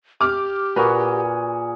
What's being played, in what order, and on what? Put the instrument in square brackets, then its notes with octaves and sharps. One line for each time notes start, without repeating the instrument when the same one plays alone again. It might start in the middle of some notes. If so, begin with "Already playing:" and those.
[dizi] G4 [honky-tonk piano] D6 F6
[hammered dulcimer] A#2 F#4 G#4 [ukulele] A#4 B4